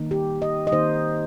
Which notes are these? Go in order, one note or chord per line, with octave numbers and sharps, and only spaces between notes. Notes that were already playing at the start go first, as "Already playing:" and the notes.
Already playing: D#3 A#3 D#4
G4
D#5
D#5
D#3 A#3 D#4 C5